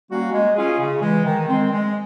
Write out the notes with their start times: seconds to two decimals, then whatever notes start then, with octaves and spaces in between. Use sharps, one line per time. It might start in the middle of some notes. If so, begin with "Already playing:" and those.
0.09 G3 A#3 C#4 F#4
0.32 G#3
0.55 C#4 F4 G#4
0.79 C#3
1.02 E3 G#3
1.25 D#3
1.48 G#3 C4
1.72 G#3